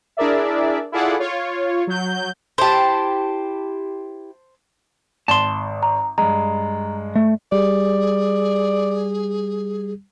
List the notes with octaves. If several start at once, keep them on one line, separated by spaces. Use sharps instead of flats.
D4 E4 G#4 A#4 D5 E5
E4 F4 G#4 A4 D5 F#5
F4 C#5
F#3 G6
E4 G4 C5 A5
G#1 A5 C6
A#5
G2 G#3 A#5
A3
G3 G#4 D5